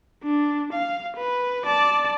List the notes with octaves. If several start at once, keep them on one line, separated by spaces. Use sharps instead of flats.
D4
F5
B4
D5 A5